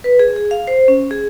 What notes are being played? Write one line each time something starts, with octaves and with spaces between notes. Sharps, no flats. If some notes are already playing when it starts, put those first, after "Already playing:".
B4
G#4
G#4
F5
C5
C#4
G#4